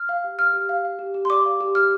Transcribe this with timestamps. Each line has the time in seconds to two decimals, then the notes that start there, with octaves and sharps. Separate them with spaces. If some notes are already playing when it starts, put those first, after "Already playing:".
Already playing: F6
0.09 F5
0.24 G4
0.39 F5 F6
0.53 G4
0.69 F5
0.85 F5
0.99 G4
1.14 G4
1.25 C6
1.30 D5 D6
1.45 F5
1.61 G4
1.75 G4 F6